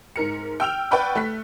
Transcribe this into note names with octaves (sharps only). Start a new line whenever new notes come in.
G#2 A#4 C#7
G5 E6 F6 F7
B4 D5 F#5 G5 B5 C#6
A3 F#6 B6